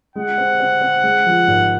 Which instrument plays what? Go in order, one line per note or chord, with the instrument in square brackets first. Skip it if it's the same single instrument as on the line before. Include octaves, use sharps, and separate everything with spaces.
[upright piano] G#3 [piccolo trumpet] F#5
[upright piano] C4
C4
C4
G#3
F3
G#1